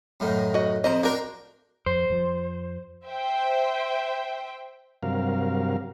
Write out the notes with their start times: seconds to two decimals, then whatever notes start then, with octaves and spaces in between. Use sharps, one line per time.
0.20 F#2 A2 D#3
0.54 F#4 D#5
0.84 F2 F3 C5 D#5 A#5
1.03 D4 F#4 A#4 G5 C6
1.86 F2 C5
2.10 F2 F3
3.06 C5 E5 G5
5.03 G2 C3 F#3 A#4 F5